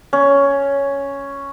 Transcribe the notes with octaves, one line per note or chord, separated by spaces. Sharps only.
C#4